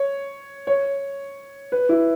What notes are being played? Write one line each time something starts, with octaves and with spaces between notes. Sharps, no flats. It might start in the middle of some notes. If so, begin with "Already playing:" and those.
Already playing: C#5
C#5
B4
E4